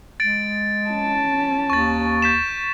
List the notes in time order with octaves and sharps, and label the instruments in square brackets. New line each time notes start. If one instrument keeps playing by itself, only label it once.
[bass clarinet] G#3 [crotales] A6 D7
[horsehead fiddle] C#4 A5
[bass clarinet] D#2 [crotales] C#6 A6
[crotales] G6 B6 E7